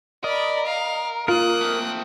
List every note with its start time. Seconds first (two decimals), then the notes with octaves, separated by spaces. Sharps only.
0.24 A#4 D5 D#5 B5
0.66 F5
1.28 A#3 F4 A#4 D#6 F#6
1.61 A3 C4